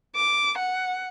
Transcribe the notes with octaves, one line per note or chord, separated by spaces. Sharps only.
D6
F#5